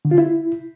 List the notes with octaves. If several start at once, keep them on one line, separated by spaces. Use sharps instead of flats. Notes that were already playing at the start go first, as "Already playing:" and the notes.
D3
F4
E4